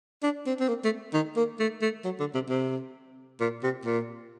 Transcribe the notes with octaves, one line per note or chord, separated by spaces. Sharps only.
D4
C4
C4
A#3
A3
D#3
A#3
A3
A3
F#3
D3
C3
C3
A#2
C3
A#2